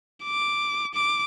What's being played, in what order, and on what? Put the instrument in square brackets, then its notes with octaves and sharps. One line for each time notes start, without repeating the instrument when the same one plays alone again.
[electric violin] D6
D6